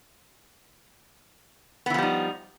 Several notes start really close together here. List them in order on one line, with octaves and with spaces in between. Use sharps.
B3 E3 F3 G3 D#4